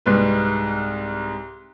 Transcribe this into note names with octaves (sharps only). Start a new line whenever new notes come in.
C2 G#2 B4